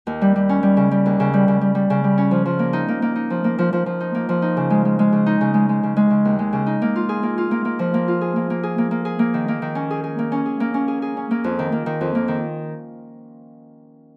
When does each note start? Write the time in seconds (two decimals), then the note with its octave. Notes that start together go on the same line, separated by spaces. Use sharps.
0.07 D#2
0.21 G3
0.36 G3
0.49 C#4
0.63 G3
0.77 C#3
0.91 G3
1.06 D#2
1.20 C#3
1.34 G3
1.48 C#3
1.61 G3
1.75 G3
1.90 C#3
2.04 G3
2.18 C#4
2.31 F3
2.45 F3
2.59 A#3
2.73 D#4
2.88 A#3
3.02 A#3
3.16 D#4
3.30 F3
3.44 A#3
3.58 F3
3.73 F3
3.86 F3
4.00 D#4
4.15 A#3
4.29 F3
4.42 D#4
4.57 C#3
4.70 G#3
4.85 G#3
4.99 G#3
5.12 C#3
5.26 D#4
5.41 C#3
5.54 G#3
5.69 G#3
5.83 C#3
5.96 G#3
6.10 C#3
6.25 D#2
6.39 G#3
6.53 C#3
6.66 D#4
6.82 A#3
6.96 F4
7.09 G#4
7.23 A#3
7.38 F4
7.51 A#3
7.65 A#3
7.79 F3
7.94 A#3
8.08 F4
8.21 G#4
8.36 A#3
8.50 A#3
8.63 G#4
8.78 A#3
8.91 A#3
9.05 G#4
9.19 A#3
9.34 D#3
9.48 A#3
9.62 D#3
9.75 C#4
9.90 G#4
10.04 G#4
10.19 A#3
10.32 C#4
10.46 G#4
10.60 A#3
10.74 C#4
10.88 G#4
11.02 G#4
11.17 C#4
11.31 A#3
11.44 F2
11.59 D#3
11.72 A#3
11.86 D#3
12.01 F2
12.15 A#3
12.28 D#3